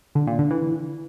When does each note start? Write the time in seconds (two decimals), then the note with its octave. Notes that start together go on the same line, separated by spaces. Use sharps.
0.15 D3
0.27 A#2
0.39 D3
0.51 E3